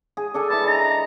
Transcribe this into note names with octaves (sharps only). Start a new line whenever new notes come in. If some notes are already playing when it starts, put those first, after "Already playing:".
G#4
D4 A4 G#5
E4 B4 A5
D#5 A#5